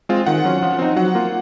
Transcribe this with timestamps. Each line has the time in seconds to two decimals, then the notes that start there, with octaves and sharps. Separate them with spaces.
0.09 G#3 C4 F4
0.26 D#3 F#5
0.44 F#3 C#4 F4
0.62 F3
0.79 C4 D#4
0.96 F#3 F#5
1.15 A#3 F4